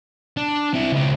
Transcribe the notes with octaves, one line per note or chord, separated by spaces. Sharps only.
D4
C4 E4
C#2 C4